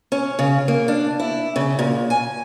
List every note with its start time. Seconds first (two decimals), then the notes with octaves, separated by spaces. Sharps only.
0.12 C#4
0.39 C#3
0.68 A#3
0.88 D4
1.20 E4
1.56 C#3
1.79 A#2
2.10 G#5